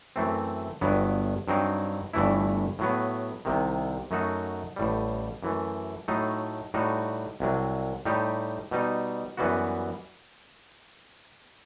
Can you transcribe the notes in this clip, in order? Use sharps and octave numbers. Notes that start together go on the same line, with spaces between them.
F#2 E3 A3 C4
G1 G2 F#3 B3
G2 F#3 C4 D#4
G1 G2 E3 A3 E4
A2 F#3 B3
C2 C3 D#3
F#2 F#3 A3 D#4 F#4
A1 A2 G3
F#2 E3 A3
A2 F#3 A3 D#4
A2 G3 D#4 F#4
C2 C3 F#3
A2 G3 D#4 G4
B2 G3 D#4
F#2 E3 G3 B3 F#4